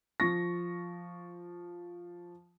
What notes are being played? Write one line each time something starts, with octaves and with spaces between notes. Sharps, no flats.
F3 C#6 A#6